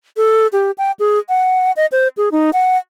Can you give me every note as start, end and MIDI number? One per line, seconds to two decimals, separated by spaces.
0.17 0.47 69
0.53 0.71 67
0.78 0.92 79
0.99 1.19 68
1.29 1.72 78
1.77 1.86 75
1.92 2.08 72
2.17 2.29 68
2.32 2.50 63
2.53 2.77 78